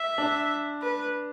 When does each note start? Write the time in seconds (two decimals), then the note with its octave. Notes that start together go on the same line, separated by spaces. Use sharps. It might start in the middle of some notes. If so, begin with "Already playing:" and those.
Already playing: E5
0.18 D4
0.82 B4